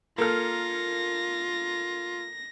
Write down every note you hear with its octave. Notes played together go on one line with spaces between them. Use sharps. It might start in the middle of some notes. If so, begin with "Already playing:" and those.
A#3 F4 A4 F6 A#6